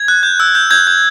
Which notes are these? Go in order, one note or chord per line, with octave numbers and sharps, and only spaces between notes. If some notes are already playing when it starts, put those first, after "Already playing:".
Already playing: G#6
F#6
G6
E6
G6
G6 G#6
G6